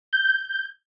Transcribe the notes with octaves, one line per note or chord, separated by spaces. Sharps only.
G6